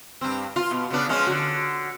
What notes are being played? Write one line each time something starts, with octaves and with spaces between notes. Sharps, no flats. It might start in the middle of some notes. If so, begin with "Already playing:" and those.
G2 C4
F4
B2
C#3 B3 D4
F3 G#3 C#4
D3 F#4